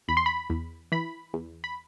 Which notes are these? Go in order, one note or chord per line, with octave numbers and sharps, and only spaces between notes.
E2 B5
C6
B5
E2
E3 B5
E2
B5